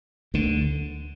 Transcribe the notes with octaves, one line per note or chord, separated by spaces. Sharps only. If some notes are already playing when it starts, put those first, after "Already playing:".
D2 D3